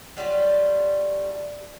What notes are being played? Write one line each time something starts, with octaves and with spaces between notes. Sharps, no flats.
F#3 G3 A3 F4